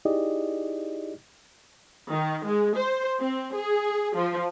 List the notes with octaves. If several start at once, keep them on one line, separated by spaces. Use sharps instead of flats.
D#4 E4 G4 G#4 D5 D#5
D#3
G#3
C5
C4
G#4
F3